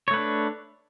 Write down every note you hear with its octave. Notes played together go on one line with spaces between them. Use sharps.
A3 D4 B4 C#5